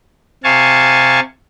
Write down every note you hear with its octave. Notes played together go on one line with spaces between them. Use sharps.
C3 F5 G#5 A5 C#6